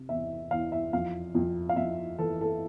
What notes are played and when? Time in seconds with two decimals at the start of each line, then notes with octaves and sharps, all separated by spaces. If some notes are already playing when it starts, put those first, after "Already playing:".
Already playing: C3
0.09 E2 E5
0.51 E2 F5
0.72 E5
0.93 F2 F5
1.35 F2
1.69 F5
1.76 F2 E5
2.19 E3 A4
2.41 A4